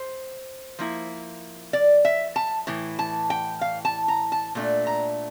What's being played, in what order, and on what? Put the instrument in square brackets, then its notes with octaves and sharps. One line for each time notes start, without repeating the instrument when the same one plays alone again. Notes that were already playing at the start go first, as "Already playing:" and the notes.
Already playing: [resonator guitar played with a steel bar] C5
F3 A#3 E4
D5
E5
A5
A2 E3
A5
G5
F5
A5
A#5
A5
A#2 A3 D4
A#5